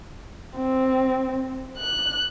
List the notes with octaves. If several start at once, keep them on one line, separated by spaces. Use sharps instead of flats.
C4
F#6